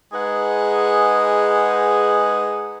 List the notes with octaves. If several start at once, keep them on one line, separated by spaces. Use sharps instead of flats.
G#3 D#4 G#4 B4 F#5